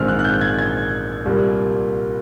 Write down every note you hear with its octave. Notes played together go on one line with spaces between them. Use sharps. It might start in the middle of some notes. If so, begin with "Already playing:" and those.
Already playing: A#1 G#2 D#3 G#3 C4 F6
F#6
F#6
G6
G#6
G#6
C2 A#2 G3 A#3